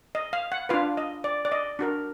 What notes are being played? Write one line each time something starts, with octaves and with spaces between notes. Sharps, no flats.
D#5
F5
F#5
D4 F4 B4 F5
D#5
D5
D5
D#5
D4 F#4 A#4